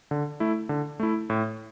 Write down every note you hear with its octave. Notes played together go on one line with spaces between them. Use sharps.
D3
A3 E4
D3
A3 E4
A2